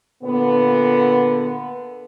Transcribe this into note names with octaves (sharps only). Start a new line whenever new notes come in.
A#2 D3 B3